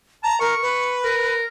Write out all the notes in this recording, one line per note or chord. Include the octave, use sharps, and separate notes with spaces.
A5 A#5
A#4 C#6
B4
A#4